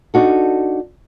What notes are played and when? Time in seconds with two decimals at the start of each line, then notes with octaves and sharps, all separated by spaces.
0.14 D4 D#4 F#4 A4